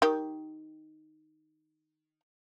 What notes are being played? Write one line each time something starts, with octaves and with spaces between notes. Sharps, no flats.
D#3 G4